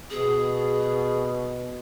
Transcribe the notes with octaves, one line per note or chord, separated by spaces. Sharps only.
B2 G#4